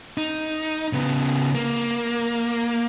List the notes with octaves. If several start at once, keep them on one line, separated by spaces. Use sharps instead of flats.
D#4
C#3 B3
A#3